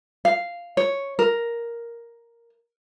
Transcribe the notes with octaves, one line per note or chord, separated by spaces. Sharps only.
F5
C#5
A#4